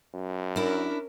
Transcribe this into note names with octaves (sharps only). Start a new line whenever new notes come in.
F#2
C#4 D4 E4 A#4